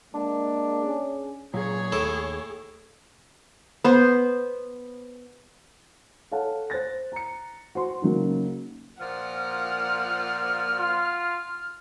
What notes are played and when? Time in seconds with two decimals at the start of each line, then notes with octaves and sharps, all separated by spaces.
0.14 G#3 A#3 D4
0.84 C#4 G#4
1.54 A#2 F#3 G#4 C#5
1.92 D#2 A2 A4
3.84 B3 C5
6.31 A4 C#5 F5 F#5 A5
6.70 C5 F#6 A6 A#6
7.12 A#5 C#7
7.75 F#4 C5 C6
8.02 C#3 F#3 A#3 D#4
9.00 A#2 F3 F#5 F6
10.78 F4